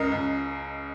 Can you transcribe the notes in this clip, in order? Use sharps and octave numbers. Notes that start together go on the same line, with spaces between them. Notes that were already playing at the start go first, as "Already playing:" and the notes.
Already playing: C#2 A#4 D#5
C#2